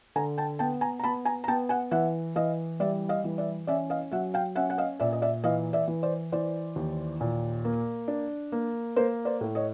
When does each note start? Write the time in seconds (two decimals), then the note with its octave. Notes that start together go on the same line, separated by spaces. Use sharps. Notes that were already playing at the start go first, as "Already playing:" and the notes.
0.16 D3 G#5 A#5
0.38 G5 A5
0.59 B3 G5 A5
0.81 G#5 A#5
0.99 A#5
1.04 B3 A5 B5
1.25 G#5 A#5
1.44 A#5
1.48 B3 G5 A5
1.69 F#5 G#5
1.91 E3 E5 F#5
2.36 E3 D#5 F5
2.80 G3 D5 E5
3.09 D#5 F5
3.24 E3
3.38 D5 E5
3.67 C#4 D5 E5
3.90 D#5 F5
4.12 F#3 E5 F#5
4.34 F5 G5
4.55 C#4 E5 F#5
4.70 F#5
4.78 D#5 F5
5.00 A#2 D5 E5
5.13 D#5
5.22 D5 E5
5.44 E3 D#5 F5
5.73 D5 E5
5.88 E3
6.03 C5 D5
6.32 E3 C5 D5
6.76 D#2
7.21 A#2
7.65 A#3
8.08 D4
8.52 A#3
8.96 A#3 A#4 C5
9.25 C5 D5
9.41 A2
9.55 C#5 D#5